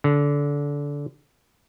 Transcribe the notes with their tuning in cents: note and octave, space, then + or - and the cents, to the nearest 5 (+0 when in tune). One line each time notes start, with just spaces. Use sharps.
D3 -25